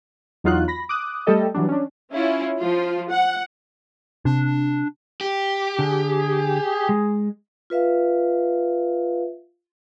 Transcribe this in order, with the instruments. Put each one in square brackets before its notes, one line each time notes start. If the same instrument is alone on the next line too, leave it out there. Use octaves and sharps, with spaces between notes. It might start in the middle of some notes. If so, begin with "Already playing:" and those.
[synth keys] E2 F#3 D#4 F4 F#4 F#6
B5 A#6
D6 D#6 F#6
G3 A3 G4 A4 D#5
E3 F#3 G3 D4
C#4 D4
[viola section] C#4 E4 F4
F3 F4
F#5
[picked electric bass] C3 [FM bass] D4
[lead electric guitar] G4
[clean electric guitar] D3 [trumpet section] G#4
[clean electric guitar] G#3
[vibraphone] F4 B4 E5 F5